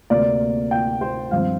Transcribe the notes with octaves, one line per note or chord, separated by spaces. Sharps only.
D2 C3 A#3 D5
G5
C5
G2 F3 C4 F5